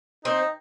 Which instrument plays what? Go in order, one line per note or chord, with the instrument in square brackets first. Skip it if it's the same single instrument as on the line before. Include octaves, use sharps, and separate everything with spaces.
[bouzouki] C4 [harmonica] D#4